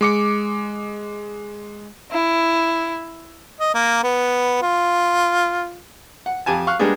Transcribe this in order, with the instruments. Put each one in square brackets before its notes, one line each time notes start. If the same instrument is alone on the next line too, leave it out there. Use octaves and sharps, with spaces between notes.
[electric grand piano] G#3 D6 C#7
[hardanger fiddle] E4
[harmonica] D#5
A#3
B3
F4
[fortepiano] F#5
F2 G4 G#5 A5
F5 C#6 F6 F#6
G3 G#3 A#3 B3 D4 G#4